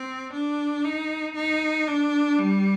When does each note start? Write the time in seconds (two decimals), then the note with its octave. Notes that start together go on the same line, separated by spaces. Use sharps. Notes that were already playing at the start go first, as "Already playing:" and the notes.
Already playing: C4
0.34 D4
0.85 D#4
1.36 D#4
1.87 D4
2.39 G3